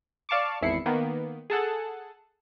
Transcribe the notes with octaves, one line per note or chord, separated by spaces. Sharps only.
D5 F5 A5 C#6 D6
G#1 E2 E4 C7 C#7
D#3 A#3 B3
G#4 A4 F#5 A5